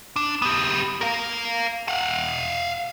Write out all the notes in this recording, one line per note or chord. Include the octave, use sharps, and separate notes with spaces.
D4
B3 G4
A#4 F5
F5 F#5